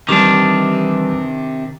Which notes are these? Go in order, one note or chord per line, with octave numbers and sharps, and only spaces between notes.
C3 D#3 E3 G3 D4 G4 D6